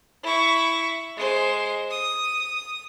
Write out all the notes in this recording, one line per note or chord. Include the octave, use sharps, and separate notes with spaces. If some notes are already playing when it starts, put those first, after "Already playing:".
E4 C#6
G#3 C5
D#6